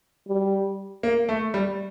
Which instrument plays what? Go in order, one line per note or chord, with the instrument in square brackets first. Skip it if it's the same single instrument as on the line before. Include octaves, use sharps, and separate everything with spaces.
[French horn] G3
[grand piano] A#3
A3
G3